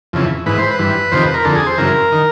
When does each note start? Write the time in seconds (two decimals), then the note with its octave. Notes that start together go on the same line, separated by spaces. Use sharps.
0.13 F2 C#3 E3
0.46 G#2 E3 B4
0.58 C5
0.71 B4
0.79 G2 E3
1.12 F2 C3 D#3 C5
1.23 B4
1.34 A#4
1.45 F2 D3 A4
1.56 G#4
1.67 C5
1.78 F#2 C#3 E3 A#4
2.12 D#3